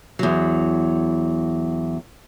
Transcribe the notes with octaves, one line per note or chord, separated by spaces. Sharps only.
E2 F#3